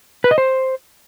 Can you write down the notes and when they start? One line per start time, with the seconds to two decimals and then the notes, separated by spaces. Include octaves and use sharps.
0.24 B4
0.31 D#5
0.38 C5